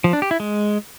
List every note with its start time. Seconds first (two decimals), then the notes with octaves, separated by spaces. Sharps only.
0.04 F3
0.13 D4
0.22 G4
0.31 E4
0.40 G#3